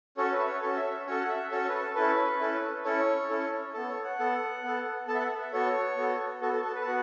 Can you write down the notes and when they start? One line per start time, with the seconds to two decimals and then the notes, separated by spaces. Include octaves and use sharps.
0.17 C#4 F#4 A4 C#5
0.33 B4
0.40 E5
0.47 C#5
0.62 C#4 F#4 A4 C#5
0.76 E5
0.91 E5
1.07 C#4 F#4 A4 C#5
1.21 F#5
1.29 E5
1.51 C#4 F#4 A4 C#5
1.69 B4
1.74 A4
1.96 C#4 E4 A4 B4
2.40 C#4 E4 A4
2.84 C#4 E4 A4 C#5
3.29 C#4 E4 A4
3.74 B3 A4
3.89 C#5
4.04 F#5
4.19 B3 A4
4.63 B3 A4
5.08 B3 A4 A5
5.15 E5
5.20 F#5
5.41 E5
5.52 B3 F#4 A4 C#5
5.97 B3 F#4 A4
6.42 B3 F#4 A4
6.53 A4
6.64 A4
6.75 B4
6.82 A5
6.87 B3 F#4 F#5